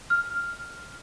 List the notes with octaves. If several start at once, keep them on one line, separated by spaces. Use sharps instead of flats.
F6